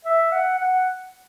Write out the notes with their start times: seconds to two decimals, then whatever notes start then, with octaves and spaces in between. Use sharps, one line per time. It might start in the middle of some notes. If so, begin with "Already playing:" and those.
0.05 E5
0.32 F#5
0.58 F#5